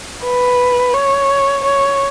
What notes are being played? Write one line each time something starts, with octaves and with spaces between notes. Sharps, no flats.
B4
C#5
C#5